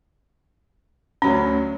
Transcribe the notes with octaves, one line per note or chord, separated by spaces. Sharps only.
D2 F#3 C#4 B5